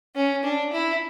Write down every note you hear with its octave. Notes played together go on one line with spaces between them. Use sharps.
C#4
D4
E4